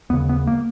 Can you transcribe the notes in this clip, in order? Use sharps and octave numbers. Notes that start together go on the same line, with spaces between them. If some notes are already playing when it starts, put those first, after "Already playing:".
D#2 C#3 B3
B3
A#3